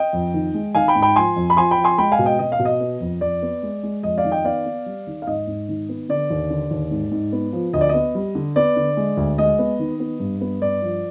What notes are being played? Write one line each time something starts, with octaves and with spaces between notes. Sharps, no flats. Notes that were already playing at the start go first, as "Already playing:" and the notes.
Already playing: D#5 G5
F2
D#3
G#3
D#3 F5 G#5
G5 B5
G#2
G5 B5
F3 G#5 C6
F2
B5
F3 G#5 C6
G5 B5
F3
G#5 C6
G#3 G5 B5
F5 G#5
B2
D#5 G5
B2 D#5
F5
B2
D#5
B3
F2
F2 D5
B3
G#3
G#3
F2 D#5
D5 F5
D#3
D#5 G5
B3 D5 F5
B3
G3
D#3
F5
G#2 D#5
G#2
D#3
B3
D3 D5
D#2
D3
D#2
G#2
G#2
B3
F3
D2 D#5
D5
D#5
B3
G3
D3
B3 D5
D3
G#3
D2
G#3 D#5
B3
D#3
B3
G2
B3
G2 D5
F3